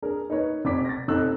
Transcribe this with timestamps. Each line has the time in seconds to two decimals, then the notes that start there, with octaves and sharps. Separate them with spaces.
0.02 D4 G#4 A#4
0.30 D#4 A#4 B4 C#5
0.65 F1 D5 D6 B6
0.85 A6 A#6
1.08 F1 D#4 A4 E6 F#6